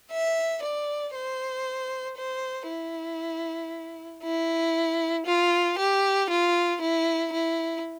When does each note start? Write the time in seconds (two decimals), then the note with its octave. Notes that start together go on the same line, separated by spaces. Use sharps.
0.12 E5
0.63 D5
1.15 C5
2.17 C5
2.69 E4
4.24 E4
5.26 F4
5.78 G4
6.30 F4
6.81 E4
7.33 E4